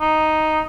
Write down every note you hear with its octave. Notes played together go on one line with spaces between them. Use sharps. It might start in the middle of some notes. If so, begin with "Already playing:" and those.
D#4